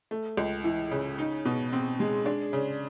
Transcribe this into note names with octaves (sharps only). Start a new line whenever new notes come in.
A3
C#2
E3
C#3
D#4
B2
C4
G#3
D4
C#3